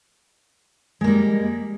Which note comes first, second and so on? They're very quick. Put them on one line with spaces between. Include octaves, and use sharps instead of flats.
G#3 A#3 G3